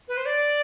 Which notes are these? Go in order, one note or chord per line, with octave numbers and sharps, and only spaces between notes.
B4
C5
D5